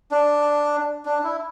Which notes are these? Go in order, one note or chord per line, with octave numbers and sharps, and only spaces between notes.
D4
D4
E4